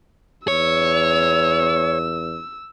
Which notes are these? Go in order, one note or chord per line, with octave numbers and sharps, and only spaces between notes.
E2 C#5 E6